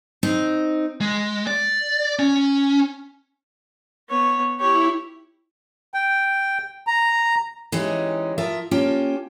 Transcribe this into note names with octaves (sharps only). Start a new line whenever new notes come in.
C4 D#4
G#3
D5
C#4
B3 C#5
E4 G4 C#5
G5
A#5
E3 G#3 C#4 D#4 G4
F3 F4 A#4 E5
A#3 C#4 F4 G4 G5 A5